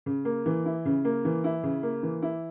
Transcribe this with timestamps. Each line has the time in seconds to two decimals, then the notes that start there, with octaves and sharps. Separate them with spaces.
0.06 C#3
0.25 A#3
0.46 E3
0.65 E4
0.85 C#3
1.05 A#3
1.25 E3
1.44 E4
1.63 C#3
1.83 A#3
2.03 E3
2.22 E4